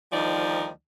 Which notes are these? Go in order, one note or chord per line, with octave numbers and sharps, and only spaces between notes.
D2 D#3 F3 G3 D#4 D5